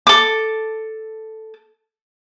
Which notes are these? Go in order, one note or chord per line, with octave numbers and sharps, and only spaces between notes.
A4 D6